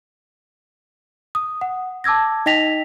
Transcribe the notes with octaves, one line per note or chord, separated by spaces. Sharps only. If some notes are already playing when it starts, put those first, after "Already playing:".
D#6
F#5
A5 D6 E6 G#6 A#6
D#4 D#5 G5 A#6 B6 F7